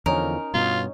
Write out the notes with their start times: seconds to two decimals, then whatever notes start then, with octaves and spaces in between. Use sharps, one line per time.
0.06 E2 D3 F3 C#4 D#4 A#4
0.54 G2 B2 F4